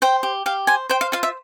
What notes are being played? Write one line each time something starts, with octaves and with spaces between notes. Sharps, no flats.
C5 G5
G4
G4 F5
C5 G#5
C5 G5
F5
F4 F5
E5